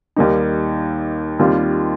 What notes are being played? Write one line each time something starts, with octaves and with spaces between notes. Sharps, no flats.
D#2 D#3 G3 A#3 D#4
D#2 D#3 G3 C4 F4